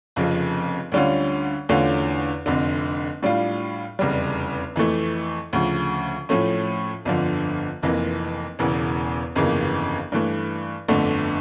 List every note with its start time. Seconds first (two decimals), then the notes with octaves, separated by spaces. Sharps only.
0.16 F1 F2 C#3 F3
0.92 D2 D3 G3 C#4 F4
1.69 E2 D3 A3 C#4 F4
2.46 F1 F2 D3
3.23 A2 G3 D4 F4
3.99 F1 E2 C#3 G3
4.76 F2 E3 A3
5.53 D2 C#3 F3
6.29 A2 F3 A3 C#4
7.05 G1 F2 D3 F3
7.82 F1 F2 E3 A#3
8.59 E1 E2 C#3 E3
9.35 G1 F2 C#3 E3 A#3
10.12 G2 E3 A3
10.88 G1 F2 D3 A3